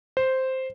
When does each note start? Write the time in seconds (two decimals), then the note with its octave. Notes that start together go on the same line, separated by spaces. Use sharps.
0.17 C5